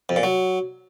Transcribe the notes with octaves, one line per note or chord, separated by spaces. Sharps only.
F2
A#2
F#3